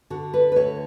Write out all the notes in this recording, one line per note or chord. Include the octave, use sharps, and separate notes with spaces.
D3 F#4
B4
B4
D2 C#5